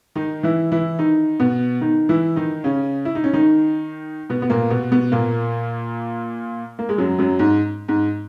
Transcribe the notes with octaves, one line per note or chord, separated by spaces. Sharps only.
D#3 D#4
E3 E4
E3 E4
D#3 D#4
B2 B3
D#3 D#4
E3 E4
D#3 D#4
C#3 C#4
E4
D#4
C#4
D#3 D#4
B2 B3
B3
A#2 A#3
B2 B3
B2 B3
A#2 A#3
A#3
G#3
F#2 F#3
F#2 F#3
G#2
G#2